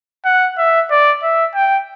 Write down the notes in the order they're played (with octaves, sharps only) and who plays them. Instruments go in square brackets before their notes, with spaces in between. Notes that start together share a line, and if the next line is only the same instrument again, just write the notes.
[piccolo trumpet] F#5
E5
D5
E5
G5